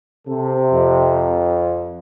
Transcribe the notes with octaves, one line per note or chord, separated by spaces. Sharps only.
C3 A4
F2